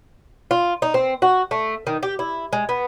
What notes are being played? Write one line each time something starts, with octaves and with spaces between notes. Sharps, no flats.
F4
D#4
C4
F#4
A3
D#3
G4
E4
G#3
B3